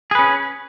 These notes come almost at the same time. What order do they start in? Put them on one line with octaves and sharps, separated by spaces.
G#4 B4 C#4